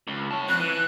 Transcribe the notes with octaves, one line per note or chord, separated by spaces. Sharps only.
C#2
C#5 A5
F2 F#6
E3